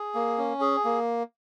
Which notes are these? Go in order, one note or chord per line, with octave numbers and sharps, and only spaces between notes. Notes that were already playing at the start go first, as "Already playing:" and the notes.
Already playing: G#4
A#3
C#4
G#4
A#3